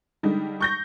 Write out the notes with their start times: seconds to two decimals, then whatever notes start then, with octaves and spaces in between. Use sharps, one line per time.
0.23 D3 G3 G#3 D#4
0.61 C#6 G6 A#6